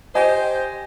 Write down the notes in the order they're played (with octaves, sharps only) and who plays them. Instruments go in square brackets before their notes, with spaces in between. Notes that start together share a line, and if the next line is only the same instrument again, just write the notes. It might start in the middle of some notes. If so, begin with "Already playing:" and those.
[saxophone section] G4 C5 [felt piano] D#5 G#5